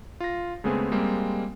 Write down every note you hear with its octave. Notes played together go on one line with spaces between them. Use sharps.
F4 A#6
C#3 G#3 A3 B3 C4 G#4
G3 G#3 A#3 C4